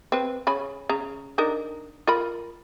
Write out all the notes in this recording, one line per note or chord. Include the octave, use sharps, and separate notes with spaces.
C4 B4
C#3 C#4 B5
C#3 A#5
D4 D#4 A#4
F4 A#4 B5